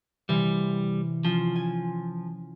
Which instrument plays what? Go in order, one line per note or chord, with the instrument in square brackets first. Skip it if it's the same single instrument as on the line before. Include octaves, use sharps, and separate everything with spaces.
[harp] C3 E3 [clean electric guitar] G3
[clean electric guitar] F3 [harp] C#4 F4
[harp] G#5